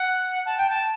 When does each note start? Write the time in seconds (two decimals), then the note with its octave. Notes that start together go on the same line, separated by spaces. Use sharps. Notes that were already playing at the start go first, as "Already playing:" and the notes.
Already playing: F#5
0.46 A5
0.57 G5
0.70 A5